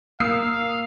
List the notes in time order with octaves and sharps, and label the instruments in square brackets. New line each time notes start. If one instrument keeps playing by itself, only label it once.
[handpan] A#3 [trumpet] F5 [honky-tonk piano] D#6 E6 C7